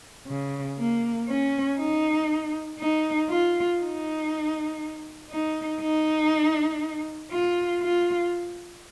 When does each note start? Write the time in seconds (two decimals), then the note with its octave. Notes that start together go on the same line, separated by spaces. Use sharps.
0.27 C#3
0.77 A#3
1.28 C#4
1.78 D#4
2.79 D#4
3.29 F4
3.80 D#4
5.30 D#4
5.81 D#4
7.32 F4
7.82 F4